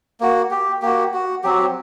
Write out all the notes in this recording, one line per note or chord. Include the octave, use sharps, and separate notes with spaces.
A#3 F#4
G4
A#3 F#4 G4
F#4
F#3 C4 F#4 G4